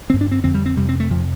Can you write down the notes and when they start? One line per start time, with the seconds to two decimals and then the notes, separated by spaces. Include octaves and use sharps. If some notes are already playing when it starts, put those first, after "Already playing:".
0.10 D3 C4
0.13 G2
0.21 D4
0.31 C4
0.43 F2 D3 C4
0.54 G3
0.66 C4
0.77 F2 C3 G3
0.89 C4
1.00 A3
1.10 F2 C3 F3